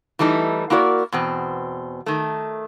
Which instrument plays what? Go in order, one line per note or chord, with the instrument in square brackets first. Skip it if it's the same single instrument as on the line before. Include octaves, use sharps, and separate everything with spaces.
[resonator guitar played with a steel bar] E3 G3 A3 D#4 E4
A#3 E4 F#4 A#4 D5
E2 B2 C4
D#3 A3